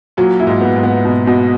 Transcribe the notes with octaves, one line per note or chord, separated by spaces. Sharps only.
A#2 F#3
A#2 E4
G#2
A#2 B3
G#2
B3
B2
B2